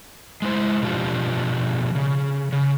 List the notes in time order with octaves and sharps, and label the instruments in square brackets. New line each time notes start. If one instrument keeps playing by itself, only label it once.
[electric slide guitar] G#3 E4 C5
B2 F3 D4 F4 G4
C#3
C#3